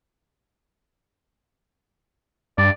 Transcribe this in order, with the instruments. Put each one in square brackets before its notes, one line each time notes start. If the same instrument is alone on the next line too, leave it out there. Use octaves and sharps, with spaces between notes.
[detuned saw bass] G2 [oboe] D5